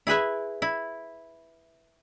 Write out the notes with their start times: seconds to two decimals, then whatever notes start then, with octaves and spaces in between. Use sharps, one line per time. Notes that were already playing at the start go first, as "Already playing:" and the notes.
0.07 E4 G#4 B4 E5
0.62 E4